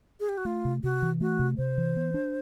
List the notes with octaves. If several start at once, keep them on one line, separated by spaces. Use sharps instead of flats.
G#4
G4
F#4
A3 F4
C3
C3 F#4
E3
A3 F#4
C3
C3 C5
E3
B3
D4